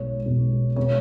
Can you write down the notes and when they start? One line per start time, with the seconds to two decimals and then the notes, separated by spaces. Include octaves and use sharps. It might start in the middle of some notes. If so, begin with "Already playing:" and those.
Already playing: B1 B2 G#3 C#5
0.26 B1 B2 G#3
0.76 B2 G#3 B3 C#5